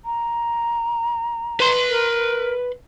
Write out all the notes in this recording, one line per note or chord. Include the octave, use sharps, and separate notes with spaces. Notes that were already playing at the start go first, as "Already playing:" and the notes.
A#5
B4 C6
A#4